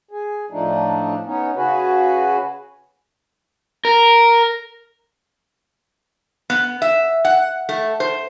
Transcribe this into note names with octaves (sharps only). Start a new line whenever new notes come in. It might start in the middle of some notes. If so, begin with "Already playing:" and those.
G#4
A2 F3 A3 D4 D#4
B3 C#4 D#4
C#3 F#4 G#4 B4
A#4
B3
E5
F#5
A3
C5